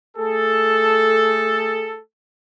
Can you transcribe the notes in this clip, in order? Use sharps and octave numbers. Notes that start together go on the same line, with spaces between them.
A3 G#4 A4